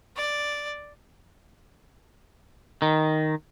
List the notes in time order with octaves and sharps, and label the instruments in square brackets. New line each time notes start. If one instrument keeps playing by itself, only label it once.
[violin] D5
[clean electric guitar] D#3